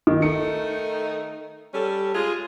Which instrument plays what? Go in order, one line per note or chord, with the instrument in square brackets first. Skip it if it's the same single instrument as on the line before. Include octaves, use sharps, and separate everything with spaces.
[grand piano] D#3
[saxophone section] D#3 A3 D#4 [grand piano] C#7
[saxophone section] G3 C#4 A4
G#3 F4 G#4